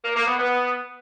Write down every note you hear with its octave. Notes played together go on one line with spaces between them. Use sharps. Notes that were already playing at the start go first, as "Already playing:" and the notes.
A#3
A#3
B3
B3